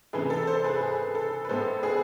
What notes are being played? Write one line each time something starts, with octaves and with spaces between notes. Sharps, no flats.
C3 E3 A3 G#4 B4
A4
A4 C5
G#4 B4
G#4
A4
B4
A2 G#3 B3 A4 C5
G#4 B4